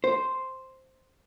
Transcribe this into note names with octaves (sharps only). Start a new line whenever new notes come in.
C5